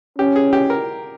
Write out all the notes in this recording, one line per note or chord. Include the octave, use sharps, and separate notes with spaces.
C#4 G4
G#4
G4
A#4